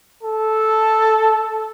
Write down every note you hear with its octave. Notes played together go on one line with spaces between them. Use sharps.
A4